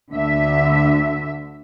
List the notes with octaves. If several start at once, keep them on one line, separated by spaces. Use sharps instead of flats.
D2 D3 E5